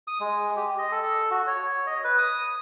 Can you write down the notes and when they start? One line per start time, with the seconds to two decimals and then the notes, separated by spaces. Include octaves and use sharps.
0.08 D#6
0.20 G#3
0.56 G4
0.78 D#5
0.91 A4
1.30 F#4
1.47 C#5
1.87 D#5
2.04 B4
2.18 D#6